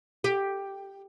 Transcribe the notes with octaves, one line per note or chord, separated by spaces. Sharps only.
G4